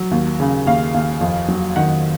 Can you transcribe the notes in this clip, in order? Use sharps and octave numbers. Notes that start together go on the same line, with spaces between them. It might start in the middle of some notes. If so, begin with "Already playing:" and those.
Already playing: F#3
D#2
C#3
D#2 F5
D#2
F2
F#3
D#3 F#5